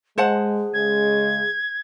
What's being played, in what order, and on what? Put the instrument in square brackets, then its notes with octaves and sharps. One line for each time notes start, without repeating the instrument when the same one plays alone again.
[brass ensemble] G#3 [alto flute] G#4 [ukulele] C5 F#5 A5
[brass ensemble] C#3 G#3 [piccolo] G#6